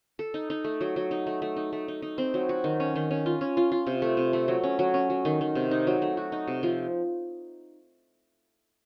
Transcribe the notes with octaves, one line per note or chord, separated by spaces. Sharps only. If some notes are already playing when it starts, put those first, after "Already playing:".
A4
D#4
D#4
A3
F#3
F#3
D#4
A3
A3
D#4
A3
D#4
D#4
C4
F#3
F#4
D#3
C#4
D#3
C#4
F4
C#4
F4
F4
C3
A3
C3
A3
F#3
C#4
F#3
C#4
F#3
D#3
D#3
C3
D#4
F#3
A3
F#4
D#4
C3
F3